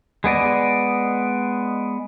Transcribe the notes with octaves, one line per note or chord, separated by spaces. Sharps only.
G#3 B3 D5 D#5